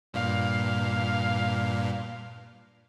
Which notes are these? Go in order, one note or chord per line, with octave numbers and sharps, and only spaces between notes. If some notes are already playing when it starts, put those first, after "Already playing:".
G2 A#2 F5